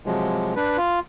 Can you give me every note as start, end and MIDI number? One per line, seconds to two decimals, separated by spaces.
0.06 0.54 48
0.06 0.54 53
0.06 0.54 54
0.06 0.54 56
0.56 0.77 62
0.56 0.77 71
0.77 1.00 65